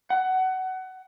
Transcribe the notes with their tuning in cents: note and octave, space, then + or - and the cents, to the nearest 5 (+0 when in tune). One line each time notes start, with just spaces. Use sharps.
F#5 +20